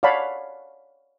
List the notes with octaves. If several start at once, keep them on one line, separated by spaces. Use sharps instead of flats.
C#5 D5 F5 F#5 A5 B5